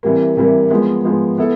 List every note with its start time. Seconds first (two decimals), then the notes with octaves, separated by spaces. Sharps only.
0.03 C3 E3 G3 A#3
0.37 C3 E3 G3 A#3
0.70 F3 G#3 B3
1.05 F3 G#3 B3
1.38 B3 E4 A4